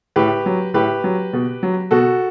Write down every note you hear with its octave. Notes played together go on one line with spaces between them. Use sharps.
A2 G4 B4
F#3
A2 G4 B4
F#3
B2
F#3
B2 F#4 A4